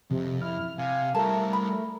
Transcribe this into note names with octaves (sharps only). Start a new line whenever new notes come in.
F2 C3
E4 F6
C3 F5 G#5
G3 A3 E4 A#4 A5
B5